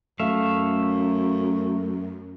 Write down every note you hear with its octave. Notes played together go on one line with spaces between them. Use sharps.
F#2 A3 E5 F5